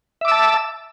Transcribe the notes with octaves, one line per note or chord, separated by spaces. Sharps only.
E5 A5 D6 E6